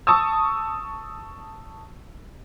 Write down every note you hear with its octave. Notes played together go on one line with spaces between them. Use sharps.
A5 C#6 D#6 E6